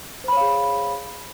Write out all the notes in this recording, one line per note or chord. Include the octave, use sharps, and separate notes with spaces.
G#4 C5 C#5 F5 B5